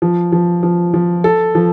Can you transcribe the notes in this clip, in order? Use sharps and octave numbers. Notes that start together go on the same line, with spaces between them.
F3
F3
F3
F3
A4
F3